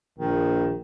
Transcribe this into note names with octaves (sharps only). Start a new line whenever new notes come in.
A#1 D#3